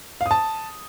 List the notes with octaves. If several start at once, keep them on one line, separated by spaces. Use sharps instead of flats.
F5
D#6
A5